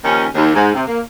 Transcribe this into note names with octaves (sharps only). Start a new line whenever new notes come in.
D#2 D#3 F3 C#4
D#2
G#2
C3
A#3